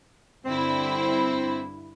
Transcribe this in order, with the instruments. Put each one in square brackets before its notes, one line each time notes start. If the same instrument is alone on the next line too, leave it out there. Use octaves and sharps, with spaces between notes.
[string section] G2 D3 E4 [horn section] C4